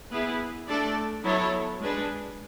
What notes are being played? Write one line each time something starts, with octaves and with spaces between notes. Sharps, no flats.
B3 E4 G#4 B4
A3 D4 A4 D5
F#3 B3 E4 A4 C#5
G#3 D4 G#4 B4